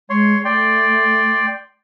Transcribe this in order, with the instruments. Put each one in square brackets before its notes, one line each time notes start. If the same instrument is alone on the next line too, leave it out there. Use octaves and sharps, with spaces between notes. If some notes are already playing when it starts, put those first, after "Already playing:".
[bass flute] G#3 [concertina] C#5 C6
[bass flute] A3 [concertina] D5 G5 C6